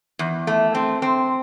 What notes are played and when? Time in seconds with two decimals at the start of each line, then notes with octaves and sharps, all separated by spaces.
0.19 E2
0.47 A3
0.75 C4
1.02 C4